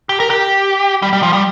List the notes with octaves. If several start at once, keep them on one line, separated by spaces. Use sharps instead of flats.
G4
A#4
G4
G3
G3
F3
G3